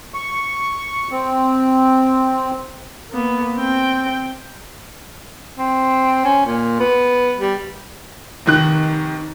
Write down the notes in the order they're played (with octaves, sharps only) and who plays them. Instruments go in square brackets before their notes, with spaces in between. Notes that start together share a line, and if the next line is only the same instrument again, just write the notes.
[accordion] C#6
C4
[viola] A#3 B3
C4 G5
[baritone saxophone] C4
C#4
A#2
B3
G3
[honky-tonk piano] F1 D#3 F#6